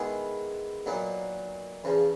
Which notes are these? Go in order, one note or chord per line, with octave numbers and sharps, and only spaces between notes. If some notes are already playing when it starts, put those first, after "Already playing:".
Already playing: D#3 G#3 B3 E4 G#4
A#2 F#3 B3 D#4
E2 C#3 F3